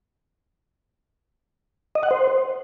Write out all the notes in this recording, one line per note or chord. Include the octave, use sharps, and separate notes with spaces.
D#5
F#5
C5